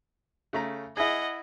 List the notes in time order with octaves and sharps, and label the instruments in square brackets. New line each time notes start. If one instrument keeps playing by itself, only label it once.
[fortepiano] C#3 A3 A#5
[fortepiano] E4 G#4 [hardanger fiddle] D#5 F#5